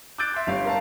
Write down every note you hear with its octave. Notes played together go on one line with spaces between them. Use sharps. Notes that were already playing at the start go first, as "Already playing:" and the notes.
D6 E6 F#6 G6 A6 D7
E5 C6 G6
G1 G3 C#5 F5
A#4 F5 A5